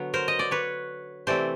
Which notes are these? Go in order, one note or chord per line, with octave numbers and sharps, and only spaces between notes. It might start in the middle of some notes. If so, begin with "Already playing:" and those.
Already playing: D3 F#3 B3
A#4 C5
D#5
D5
B4 C#5
C3 E3 A3 C4 C5 D5